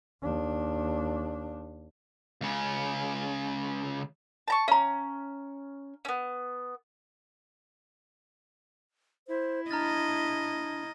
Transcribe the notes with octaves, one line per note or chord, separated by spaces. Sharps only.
D#2 D4
C#2 C#3
A5 A#5 C#6
C#4 F5 A#5
B3 C#4
E4 C5
D4 D#5 A#5 F6 A6